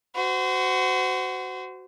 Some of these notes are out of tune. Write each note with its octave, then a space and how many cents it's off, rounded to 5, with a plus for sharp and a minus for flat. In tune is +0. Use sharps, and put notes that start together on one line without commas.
F#4 +10 C5 -30